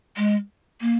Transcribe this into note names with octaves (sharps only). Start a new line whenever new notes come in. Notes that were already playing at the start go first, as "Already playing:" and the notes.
G#3
A#3